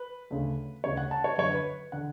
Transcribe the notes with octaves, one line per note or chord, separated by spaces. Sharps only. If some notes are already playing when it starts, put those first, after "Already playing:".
Already playing: B4
D2 C#3
D2 C#3 C#5
F#5
A5
C#5
F#2 D3 C#5
B4
D3 F#5